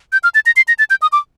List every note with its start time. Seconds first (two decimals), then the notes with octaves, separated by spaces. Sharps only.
0.13 G6
0.24 F6
0.35 A6
0.46 A#6
0.56 C7
0.68 A#6
0.79 A6
0.90 G6
1.02 D#6
1.12 D6